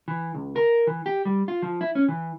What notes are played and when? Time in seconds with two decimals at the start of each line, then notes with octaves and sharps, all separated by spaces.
0.08 E3
0.34 C#2
0.56 A#4
0.87 E3
1.06 G4
1.25 G3
1.48 F4
1.63 F3
1.81 E4
1.95 C#4
2.09 E3